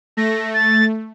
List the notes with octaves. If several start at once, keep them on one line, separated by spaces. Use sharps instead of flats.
A3 A#6
A6